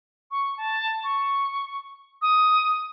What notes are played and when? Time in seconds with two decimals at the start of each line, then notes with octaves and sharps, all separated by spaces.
0.31 C#6
0.57 A5
1.04 C#6
2.22 D#6